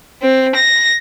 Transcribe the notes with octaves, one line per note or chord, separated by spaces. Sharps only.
C4
A#6